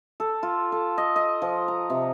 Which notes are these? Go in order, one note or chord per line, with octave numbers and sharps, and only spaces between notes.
A4
F4
A4
D#5
D#5
F3
A#5
C3